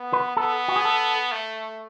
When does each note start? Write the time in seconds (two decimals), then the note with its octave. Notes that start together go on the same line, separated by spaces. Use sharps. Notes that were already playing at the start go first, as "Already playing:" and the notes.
Already playing: B3
0.13 B4
0.37 B3 A4
0.68 F#4
0.76 G#4
0.85 A4
1.32 A3